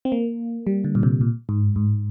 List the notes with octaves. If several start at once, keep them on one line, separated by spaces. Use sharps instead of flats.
C4
A#3
G3
D3
A#2
C3
A#2
G#2
G#2